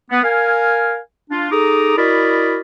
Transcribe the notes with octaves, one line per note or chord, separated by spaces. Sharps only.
B3
A#4 F5 G#5
D4 F4
D#4 G#4 A4 A#5 D6 D#6
E4 F#4 A#4 D5 D#5 B5